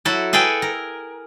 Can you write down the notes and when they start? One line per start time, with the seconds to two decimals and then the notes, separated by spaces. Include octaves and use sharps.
0.05 F#3 E4 F#4 A4
0.33 G#4 A4 B4 G5 G#5
0.62 A#4